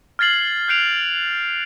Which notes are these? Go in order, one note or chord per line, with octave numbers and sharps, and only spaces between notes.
F6 G#6 A6 C7 F#7
F#6 G6 C7 D7 F7